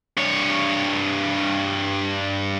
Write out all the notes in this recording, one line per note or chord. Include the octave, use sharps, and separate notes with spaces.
G2 C#5